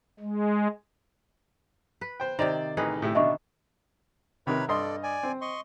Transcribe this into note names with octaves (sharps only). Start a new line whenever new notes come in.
G#3
B4
C5 G5
C3 D#3 C5 D5 G5
A1 D#4 G#4 B4
A2 E4 G4
B2 D3 D#3 D4 D#5 E5 C#6
C3 D#3 A#4 B4 C#5 B5
G2 A4 D5 D#5 C6
D5 G#5
C4
D#5 C6 C#6